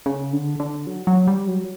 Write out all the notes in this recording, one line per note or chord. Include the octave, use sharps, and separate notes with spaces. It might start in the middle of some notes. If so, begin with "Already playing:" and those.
C#3
D3
D3
F#3
F#3
G3
F#3